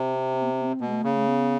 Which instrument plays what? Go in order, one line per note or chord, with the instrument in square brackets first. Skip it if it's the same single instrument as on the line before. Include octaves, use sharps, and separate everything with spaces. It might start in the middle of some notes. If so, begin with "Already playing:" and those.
Already playing: [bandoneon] C3
[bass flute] C4
B3
C4
B3
C4
[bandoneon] B2 [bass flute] A#3
[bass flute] G#3
A3
[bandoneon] C#3 [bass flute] A#3
[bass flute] A3
B3